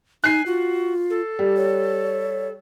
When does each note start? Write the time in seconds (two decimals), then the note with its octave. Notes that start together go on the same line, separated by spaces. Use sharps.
0.24 D#4 G#5 F#6 C7
0.46 F4 F#4
1.10 A4
1.39 G3
1.57 C#5